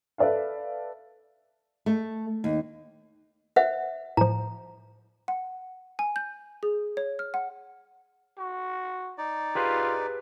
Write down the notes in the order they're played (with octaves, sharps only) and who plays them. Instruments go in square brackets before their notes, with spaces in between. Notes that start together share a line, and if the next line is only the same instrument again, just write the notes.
[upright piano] A4 B4 D5 E5 F5
[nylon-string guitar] A3
D#2
[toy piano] C5 E5 F#5
[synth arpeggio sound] A2 F3 [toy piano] A#5
[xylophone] F#5
G#5
G6
G#4
C#5
F6
F#5
[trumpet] F#4
[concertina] D#4 D5
[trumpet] F4 [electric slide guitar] G4 G#4 B4